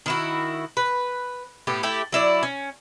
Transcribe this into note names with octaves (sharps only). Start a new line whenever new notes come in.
D#3 E4 F#4
B4
A2 B3 G4
A3 E4 G4
F#3 E4 D5
C#4